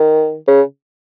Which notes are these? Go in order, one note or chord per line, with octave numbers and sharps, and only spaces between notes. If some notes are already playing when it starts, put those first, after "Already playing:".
Already playing: D#3
C#3